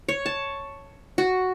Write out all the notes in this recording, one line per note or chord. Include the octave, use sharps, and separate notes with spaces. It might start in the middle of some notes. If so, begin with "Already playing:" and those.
C#5
A5
F#4